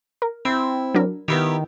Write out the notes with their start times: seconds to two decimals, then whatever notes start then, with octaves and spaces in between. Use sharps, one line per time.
0.22 A#4
0.45 C4 E4
0.95 F#3 D4 A#4
1.28 D#3 B3 E4 G4